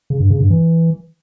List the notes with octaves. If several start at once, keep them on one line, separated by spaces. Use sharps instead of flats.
C#3
G2
C#3
G2
E3